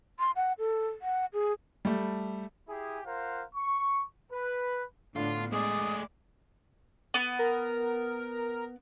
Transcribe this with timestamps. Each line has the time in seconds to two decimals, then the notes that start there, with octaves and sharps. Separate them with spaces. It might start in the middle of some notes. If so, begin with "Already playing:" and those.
0.19 C6
0.36 F#5
0.59 A4
1.02 F#5
1.33 G#4
1.85 G3 A3
2.69 E4 G4 G#4
3.06 F4 A#4 C5 F5 F#5
3.55 C#6
4.32 B4
5.16 A2 D3 B3 D4 F4
5.53 G#3 A3 G#4 D5 D#6
7.14 B3
7.39 A#4